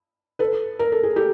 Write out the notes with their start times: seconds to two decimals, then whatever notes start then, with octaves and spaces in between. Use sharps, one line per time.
0.39 A4 B4
0.79 A#4
0.92 A4
1.03 G#4
1.16 G4 A4